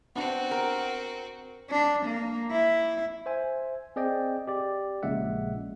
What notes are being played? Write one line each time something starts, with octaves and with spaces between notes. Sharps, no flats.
B3 C4 D4 F#4 F#5
A#4
D4
A#3
E4
C5 E5 G#5
C4 G#4 D5 D#5 G5
G4 D5
A#1 A#2 C#3 G#3 E5 F#5